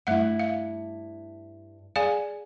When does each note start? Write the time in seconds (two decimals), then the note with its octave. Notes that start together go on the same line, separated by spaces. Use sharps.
0.07 G2 A3 E4 E5 F#5
0.39 F5
1.96 G#4 D5 F5 G#5